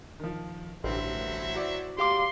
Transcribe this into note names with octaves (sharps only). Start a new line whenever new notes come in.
D#3 F3
A1 G2 D3 F#3 C4 E5
E4 F#4 D5
G4 F5 C6 D6